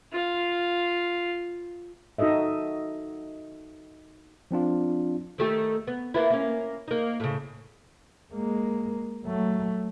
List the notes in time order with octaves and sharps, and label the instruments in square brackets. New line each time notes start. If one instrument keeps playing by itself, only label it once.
[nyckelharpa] F4 F5
[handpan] D#4 F#4 A4 D#5 E5
[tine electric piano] F3 C4 D4 F4
[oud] D#3 A3 G4
B3
A#3 B3 E4
A#3 C#4
A#3 D#4
A2 C#3
[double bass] G#3 A#3
F#3 A3